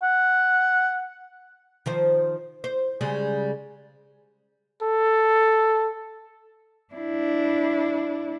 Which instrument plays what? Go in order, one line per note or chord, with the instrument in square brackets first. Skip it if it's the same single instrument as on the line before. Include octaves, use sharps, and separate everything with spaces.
[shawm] F#5
[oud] D#3 F3 C5
C5
C#3 G3 G#3
[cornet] A4
[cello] D4 E4